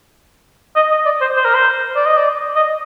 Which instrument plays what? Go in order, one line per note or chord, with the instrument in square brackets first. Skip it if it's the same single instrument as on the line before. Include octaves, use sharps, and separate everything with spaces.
[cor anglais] D#5
D#5
D5
C5
C5
A#4
C5
D5
D#5
D5
D#5